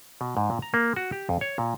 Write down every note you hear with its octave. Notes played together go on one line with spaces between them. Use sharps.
B2
G#2
A#2
A#5
A#3
F#4
G4
F2
C#5
A#2